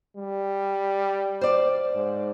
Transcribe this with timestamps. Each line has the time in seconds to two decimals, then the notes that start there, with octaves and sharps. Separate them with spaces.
0.16 G3
1.41 C5 D5 F5
1.95 G#2